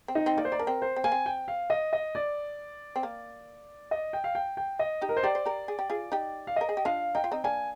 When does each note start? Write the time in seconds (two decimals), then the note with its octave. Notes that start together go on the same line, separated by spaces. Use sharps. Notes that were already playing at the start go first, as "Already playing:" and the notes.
0.08 C4
0.15 D#4
0.26 C4
0.37 A#3 D5
0.45 C5
0.52 D#4 D5
0.59 D4 A#4
0.67 C4
0.82 C5
0.96 C4
1.04 A#3 G#5
1.12 C4
1.26 G5
1.48 F5
1.70 D#5
1.93 D#5
2.15 D5
2.96 C4
3.03 A#3
3.91 D#5
4.13 G5
4.24 F5
4.35 G5
4.57 G5
4.79 D#5
5.01 D#4 G4
5.09 A#4
5.17 C5
5.23 G4 A#4 D5
5.35 C5
5.45 G4 A#4
5.68 G#4
5.79 G4
5.90 F4 G#4
6.12 D#4 G4
6.47 F5
6.56 A#4 D#5
6.69 G#4
6.77 G4
6.85 D4 F4 F5
7.15 D#4 G5
7.24 F4
7.32 C4 D#4
7.44 A#3 D4 G#5